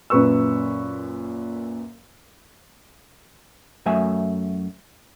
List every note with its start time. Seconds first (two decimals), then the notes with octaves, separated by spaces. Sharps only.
0.10 F#2 A#2 B4 C#6 E6
3.86 F#2 F#3 A3 E5 G#5